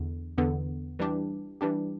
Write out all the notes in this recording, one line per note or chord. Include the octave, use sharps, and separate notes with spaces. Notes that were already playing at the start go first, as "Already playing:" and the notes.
Already playing: E2 D3
E2 D3 B3
E3 G3 D4 G4
E3 G3 D4 G4